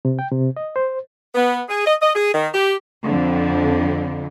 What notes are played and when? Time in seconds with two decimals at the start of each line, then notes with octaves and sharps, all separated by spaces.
0.05 C3
0.19 G5
0.32 C3
0.57 D#5
0.76 C5
1.35 B3
1.69 G#4
1.86 D#5
2.01 D#5
2.15 G#4
2.34 D#3
2.53 G4
3.03 F2 D3